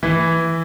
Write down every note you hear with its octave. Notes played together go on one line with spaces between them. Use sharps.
E3